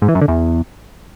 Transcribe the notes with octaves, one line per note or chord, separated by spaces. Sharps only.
G#2
E3
F#2
D3
E2